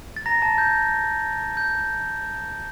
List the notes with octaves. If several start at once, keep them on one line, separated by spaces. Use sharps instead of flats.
A6
A#5 A#6
A5 A6
G6
G6